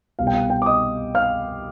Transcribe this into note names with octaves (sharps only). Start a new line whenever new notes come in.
C2 B2 F5
G5
F5
G5
D6
D#5 D#6
F5 F6